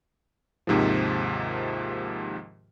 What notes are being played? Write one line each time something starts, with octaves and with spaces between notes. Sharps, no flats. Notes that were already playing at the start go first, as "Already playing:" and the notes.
D#2 G#2 C3 D#3 F3